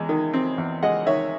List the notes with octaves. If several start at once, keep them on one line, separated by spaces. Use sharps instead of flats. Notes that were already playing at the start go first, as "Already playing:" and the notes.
Already playing: E2 G#3
D#3
C4
E2
G#3 D#5 F#5
D#3 C#5 E5